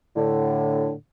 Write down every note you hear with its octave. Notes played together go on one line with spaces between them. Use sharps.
A2 D3